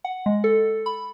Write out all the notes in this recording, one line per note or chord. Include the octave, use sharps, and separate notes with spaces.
F#5
G#3
A4
B5